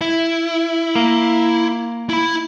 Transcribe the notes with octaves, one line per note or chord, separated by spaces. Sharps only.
E4
A#3
E4 B5